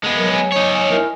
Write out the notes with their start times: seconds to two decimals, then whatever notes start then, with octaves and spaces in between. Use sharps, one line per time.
0.04 G#3 B3
0.16 F#3 A#4
0.32 G#5
0.52 D#4 C#5
0.73 G#5
0.90 E4 A#4